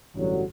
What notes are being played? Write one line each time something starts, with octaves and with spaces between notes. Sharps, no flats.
A1 G2 D3 F#3